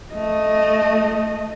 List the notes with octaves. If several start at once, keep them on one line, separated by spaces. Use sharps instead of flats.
A3 D#5